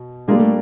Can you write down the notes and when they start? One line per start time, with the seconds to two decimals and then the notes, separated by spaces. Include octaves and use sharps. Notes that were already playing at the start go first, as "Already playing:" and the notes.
Already playing: B2
0.28 A#2 G3 G#3 A#3 D4
0.39 A3